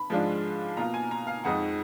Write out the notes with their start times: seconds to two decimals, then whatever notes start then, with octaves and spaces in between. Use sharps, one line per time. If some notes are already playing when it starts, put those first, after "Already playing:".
Already playing: B5
0.10 G#2 F3 G#3 D4 F4
0.77 B2 A#3 F4 A#5
0.94 G#5
1.11 A#5
1.27 F5
1.44 F2 F3 G#3 D#4 F#5